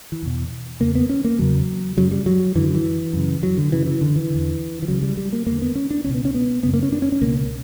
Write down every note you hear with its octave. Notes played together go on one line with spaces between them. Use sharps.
E3
E2 B2
E2 C#3 A#3
B3
C#4
A#3
E2 C#3 F#3
F#2 C#3 F#3
G3
F#3
F#2 D3 E3
E3
F#2 C#3
F#3
D3
F#2 C#3 E3
E3
D3
E3
E2 D3
E3
C#2 C#3 F#3
G3
G3
A#3
E2 D3 A#3
B3
C#4
D4
C#2 B2 C#4
B3
C#4
B3
F#2 C#3 B3
A#3
C#4
D4
C#4
C#4
C#2 B2 A#3